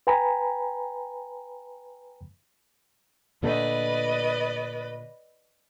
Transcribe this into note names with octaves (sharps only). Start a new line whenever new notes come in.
B4 G5 G#5 A#5 B5
A#2 D3 A3 B4 D5 D#5